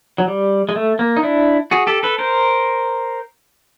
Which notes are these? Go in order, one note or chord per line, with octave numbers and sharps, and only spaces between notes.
F#3
G3
G#3
A3
A#3
D#4
D4 E4
F#4 G#4
G4 A4
A4 B4
A#4 C5